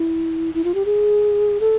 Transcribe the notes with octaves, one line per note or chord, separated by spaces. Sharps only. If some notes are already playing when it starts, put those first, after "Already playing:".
Already playing: E4
E4
F4
G4
G#4
A4